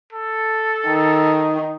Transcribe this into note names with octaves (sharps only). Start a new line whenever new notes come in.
A4
D#3